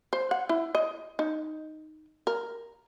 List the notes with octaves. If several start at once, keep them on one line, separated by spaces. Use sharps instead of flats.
C5
F#5
E4
D#5
D#4
A#4